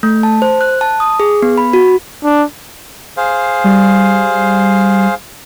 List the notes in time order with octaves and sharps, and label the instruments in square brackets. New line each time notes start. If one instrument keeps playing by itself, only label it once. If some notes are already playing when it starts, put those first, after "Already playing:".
[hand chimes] A3
A5
C5
F#6
A5
D#6
G#4
B3
B5
F#4
[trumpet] D4
[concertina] G#4 C5 F5
[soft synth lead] G3